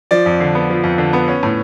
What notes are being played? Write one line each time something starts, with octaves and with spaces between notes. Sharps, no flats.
F3 D5
F2
D3
B3
F3
F2
D3
B3
C#4
A2